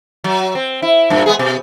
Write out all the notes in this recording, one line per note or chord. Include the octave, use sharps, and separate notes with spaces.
F#3
C4
E4
G2 A#2
G#3 B3 G#4
B2